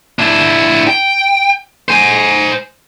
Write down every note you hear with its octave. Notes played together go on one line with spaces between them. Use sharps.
D4 E4
G5
C5 G#5